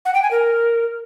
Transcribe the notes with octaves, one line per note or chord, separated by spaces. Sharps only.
F#5
G5
G#5
A#4